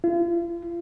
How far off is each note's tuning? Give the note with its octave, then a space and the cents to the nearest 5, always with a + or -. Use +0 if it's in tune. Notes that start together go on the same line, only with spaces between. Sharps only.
F4 -40